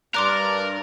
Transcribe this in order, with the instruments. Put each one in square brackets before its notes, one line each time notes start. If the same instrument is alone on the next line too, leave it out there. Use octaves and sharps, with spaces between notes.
[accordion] G2 [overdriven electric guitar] A#4 [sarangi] D5 [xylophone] C6 D6 F#6